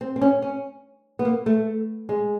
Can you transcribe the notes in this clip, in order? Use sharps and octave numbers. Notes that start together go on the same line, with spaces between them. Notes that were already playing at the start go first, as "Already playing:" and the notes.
C4
C4
C#4
C#4
B3
A#3
A3
G#3